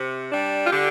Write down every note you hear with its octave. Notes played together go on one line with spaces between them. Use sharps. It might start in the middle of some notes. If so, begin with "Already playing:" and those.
Already playing: C3
G3 D4
F4
D3 G4